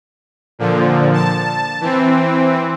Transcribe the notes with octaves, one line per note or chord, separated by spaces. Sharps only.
A#2 D3 F3
A5
E3 C4